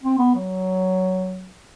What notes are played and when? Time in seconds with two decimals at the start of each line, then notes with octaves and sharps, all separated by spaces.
0.03 C4
0.18 B3
0.34 F#3